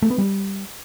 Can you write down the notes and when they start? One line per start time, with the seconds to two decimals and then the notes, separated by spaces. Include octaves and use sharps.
0.02 A3
0.10 B3
0.18 G3